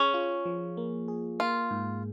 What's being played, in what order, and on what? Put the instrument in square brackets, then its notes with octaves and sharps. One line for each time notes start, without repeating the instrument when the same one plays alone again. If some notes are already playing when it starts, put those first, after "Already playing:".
Already playing: [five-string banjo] C#4 [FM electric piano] G#4
[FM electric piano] F4
F3
A#3
G#4
[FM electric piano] A#3 [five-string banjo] F4
[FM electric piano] G#2